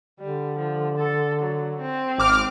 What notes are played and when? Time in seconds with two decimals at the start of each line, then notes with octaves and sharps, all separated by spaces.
0.20 D3 G3
0.59 F3
0.98 A4
1.42 F#3
1.81 C4
2.19 G#1 D6 F6